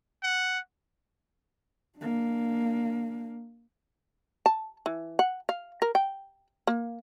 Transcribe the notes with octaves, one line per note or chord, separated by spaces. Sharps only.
F#5
A#3 D4
A5
E3
F#5
F5
A#4
G5
A#3